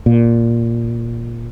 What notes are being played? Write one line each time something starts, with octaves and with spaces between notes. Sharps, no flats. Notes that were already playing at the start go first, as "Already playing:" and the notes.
A#2